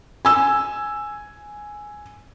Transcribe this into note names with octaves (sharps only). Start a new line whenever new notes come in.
G#5 E6